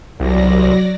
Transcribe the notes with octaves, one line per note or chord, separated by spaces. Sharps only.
C2 F#3 D5 A#6